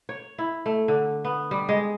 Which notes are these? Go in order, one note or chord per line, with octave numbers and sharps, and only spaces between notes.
C#5
E4
A3
D3
B3
G3
G#3